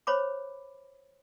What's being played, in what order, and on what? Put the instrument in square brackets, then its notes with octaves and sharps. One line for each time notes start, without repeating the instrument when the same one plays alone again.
[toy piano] C5 C#5 B5 D6